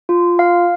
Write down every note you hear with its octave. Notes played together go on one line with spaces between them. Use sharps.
F4
F5